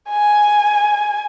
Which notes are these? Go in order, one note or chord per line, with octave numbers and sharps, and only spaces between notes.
G#5